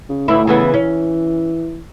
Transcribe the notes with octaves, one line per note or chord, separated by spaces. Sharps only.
C#3
D2 A2 E3 E4
C#3 E3 B3
E3 C#4